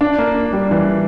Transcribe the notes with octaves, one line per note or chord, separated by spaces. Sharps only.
D4
A#3
G3
E3